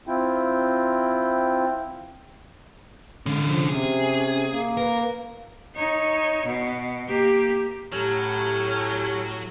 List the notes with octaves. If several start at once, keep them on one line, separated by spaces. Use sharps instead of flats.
C4 E4 F4 G5
D3 G#3 C#4
F3
C3 C#4 G#4
A#3
A#4 B4
D#4 C#5
B2
A#3 G4
A2 F#3 C#4 G4 A#5